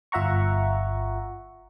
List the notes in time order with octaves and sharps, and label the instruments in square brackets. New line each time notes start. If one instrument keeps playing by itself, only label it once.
[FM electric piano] G1 F4 E5 F#5 A#5 C#6